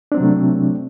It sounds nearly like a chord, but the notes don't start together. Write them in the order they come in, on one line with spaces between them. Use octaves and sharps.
D4 C4 F#3 C3 A3